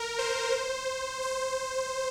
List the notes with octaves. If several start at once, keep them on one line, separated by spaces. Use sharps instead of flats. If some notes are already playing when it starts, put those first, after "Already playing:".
Already playing: A#4
C5
C5